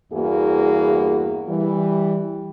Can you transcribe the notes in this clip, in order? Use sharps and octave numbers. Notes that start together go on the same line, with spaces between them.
E2 G2 A#3 E4 F#4 G#4
E3 G3